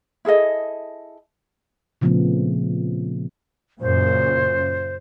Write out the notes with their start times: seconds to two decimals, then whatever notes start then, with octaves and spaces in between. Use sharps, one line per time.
0.25 E4 G#4 A4 D#5
2.01 A#2 C#3 F3 A3 B3 C4
3.81 F#2 A#2 C#3 C5